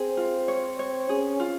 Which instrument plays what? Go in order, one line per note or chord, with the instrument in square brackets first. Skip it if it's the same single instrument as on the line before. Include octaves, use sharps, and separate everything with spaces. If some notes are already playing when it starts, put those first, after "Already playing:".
Already playing: [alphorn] C4 [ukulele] G#4
[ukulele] F4
C#5
C#5
[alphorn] C#4 [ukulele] G#4
[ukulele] F4